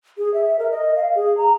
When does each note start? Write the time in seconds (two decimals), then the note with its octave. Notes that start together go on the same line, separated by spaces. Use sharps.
0.18 G#4
0.34 E5
0.59 A#4
0.71 D#5
0.96 F5
1.15 G#4
1.37 A#5